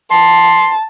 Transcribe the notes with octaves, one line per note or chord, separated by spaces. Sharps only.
A5 C6